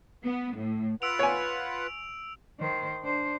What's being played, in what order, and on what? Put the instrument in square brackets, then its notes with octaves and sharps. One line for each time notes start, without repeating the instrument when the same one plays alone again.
[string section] B3
A2
[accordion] F4 B4 F#5 [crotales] E6 D7 F7
[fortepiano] C#5 G#5
[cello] D#3 C5
D4 C5